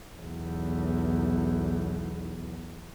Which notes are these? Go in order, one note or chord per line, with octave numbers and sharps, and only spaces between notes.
B1 E2